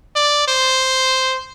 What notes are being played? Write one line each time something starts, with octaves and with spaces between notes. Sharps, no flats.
D5
C5